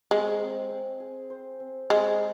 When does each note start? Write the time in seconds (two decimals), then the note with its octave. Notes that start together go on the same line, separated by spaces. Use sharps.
0.11 G#3 C4
0.40 C4
0.70 C4
1.00 G#4
1.30 C5
1.60 C4
1.90 G#3 C4